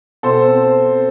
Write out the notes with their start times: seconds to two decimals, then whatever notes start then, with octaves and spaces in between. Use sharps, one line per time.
0.23 B2 A4 C5
0.48 C4